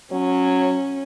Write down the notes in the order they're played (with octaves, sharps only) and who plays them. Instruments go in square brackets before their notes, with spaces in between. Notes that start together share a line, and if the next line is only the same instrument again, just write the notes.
[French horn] F#3 [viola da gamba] C#4